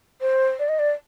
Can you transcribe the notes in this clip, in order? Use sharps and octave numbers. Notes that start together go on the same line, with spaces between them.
C5
D5
D#5
D5